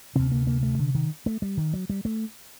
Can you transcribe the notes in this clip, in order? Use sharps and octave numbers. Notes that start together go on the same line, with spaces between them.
D2 C3 C4
A#3
A#3
A3
D3
D#3
A3
G3
D#3
F#3
G3
A3